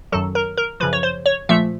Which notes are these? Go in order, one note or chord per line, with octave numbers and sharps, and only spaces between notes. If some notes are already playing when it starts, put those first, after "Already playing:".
F#2 D#3 F#3 A4
A#4
A#4
F#2 C#3 F3 B4
C#5
C5
C#5
A#2 F3 A3 E5